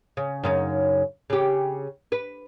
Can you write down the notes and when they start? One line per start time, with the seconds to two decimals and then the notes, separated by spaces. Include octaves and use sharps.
0.17 C#3
0.43 F#2 C#3 D#4
1.30 C#3 G4
2.12 B4